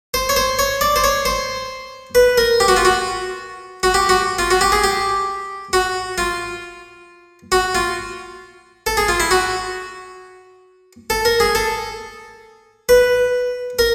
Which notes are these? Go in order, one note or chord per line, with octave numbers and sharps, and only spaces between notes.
C5
C#5
C5
C#5
D5
C5
C#5
C5
B4
A#4
G4
F#4
F4
F#4
F#4
G4
F#4
F4
F#4
G4
G#4
G4
F#4
F4
F#4
F4
A4
G#4
F4
E4
F#4
A4
A#4
G#4
A4
B4
A#4